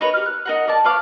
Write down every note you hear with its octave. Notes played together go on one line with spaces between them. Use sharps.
D#4 A#4 B4 C#5
G4 F6
F#6
D#4 A#4 F#5
A#4 D5 A5
B4 C#5 F5 D6